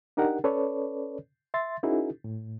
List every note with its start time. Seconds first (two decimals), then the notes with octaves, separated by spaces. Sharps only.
0.17 D4 D#4 G4 A#4 F#5
0.44 C#4 A4 B4 C#5 D5
1.54 E5 C6 A6
1.83 C#4 D#4 E4 F#4 G#4 A#4
2.24 A2